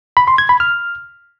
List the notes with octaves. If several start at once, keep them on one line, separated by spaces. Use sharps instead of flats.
B5
C6
G#6
B5
F6